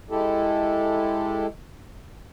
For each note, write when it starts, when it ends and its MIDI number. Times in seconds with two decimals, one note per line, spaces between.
0.10 1.46 56
0.10 1.46 64
0.10 1.46 67
0.10 1.46 69